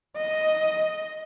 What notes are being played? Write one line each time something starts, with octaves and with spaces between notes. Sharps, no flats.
D#5